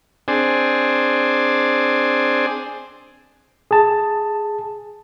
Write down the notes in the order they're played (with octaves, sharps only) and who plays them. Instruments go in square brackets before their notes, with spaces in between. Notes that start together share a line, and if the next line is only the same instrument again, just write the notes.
[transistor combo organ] C4 D4 G#4
[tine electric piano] G#4 A5